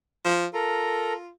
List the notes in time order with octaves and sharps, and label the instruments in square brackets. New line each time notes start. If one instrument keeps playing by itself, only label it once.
[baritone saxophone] F3
[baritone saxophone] F4 [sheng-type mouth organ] A4 A#4 A#5